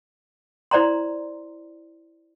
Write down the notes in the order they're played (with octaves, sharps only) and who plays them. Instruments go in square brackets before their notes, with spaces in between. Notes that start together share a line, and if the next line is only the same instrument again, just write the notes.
[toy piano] E4 C5 D5 A#5 C6